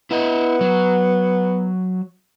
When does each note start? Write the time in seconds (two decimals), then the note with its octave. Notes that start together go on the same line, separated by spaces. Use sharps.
0.11 B3 E4 D#5
0.61 F#3